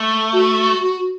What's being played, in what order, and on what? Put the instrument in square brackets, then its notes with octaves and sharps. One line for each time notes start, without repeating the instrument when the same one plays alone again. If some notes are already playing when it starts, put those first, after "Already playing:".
Already playing: [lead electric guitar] A3
[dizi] F#4